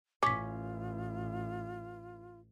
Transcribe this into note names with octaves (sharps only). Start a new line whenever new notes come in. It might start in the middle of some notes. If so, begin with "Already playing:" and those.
A1 C#4 F4 D6 B6